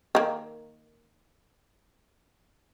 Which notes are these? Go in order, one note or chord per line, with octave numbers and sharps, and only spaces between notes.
D#3 A#3